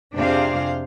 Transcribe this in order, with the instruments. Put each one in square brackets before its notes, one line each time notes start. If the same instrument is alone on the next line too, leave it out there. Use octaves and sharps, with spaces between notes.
[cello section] F2 C3 D4 G#4 C5 F5